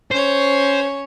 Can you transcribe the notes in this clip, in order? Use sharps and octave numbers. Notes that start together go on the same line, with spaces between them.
C#4 C5 C#5